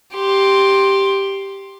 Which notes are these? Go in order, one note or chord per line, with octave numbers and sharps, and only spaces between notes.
G4 C6